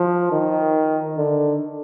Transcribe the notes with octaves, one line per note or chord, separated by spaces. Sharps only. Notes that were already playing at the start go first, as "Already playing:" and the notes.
Already playing: F3
D#3
D3